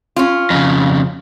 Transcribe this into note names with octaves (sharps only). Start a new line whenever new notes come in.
C#4 F4
F2 C#3